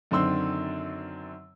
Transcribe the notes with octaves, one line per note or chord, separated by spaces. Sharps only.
F#2 D3 D#3 C4 C6 E6